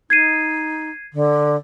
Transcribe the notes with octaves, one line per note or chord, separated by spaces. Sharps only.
D#4 G#6 C7 D#7
D3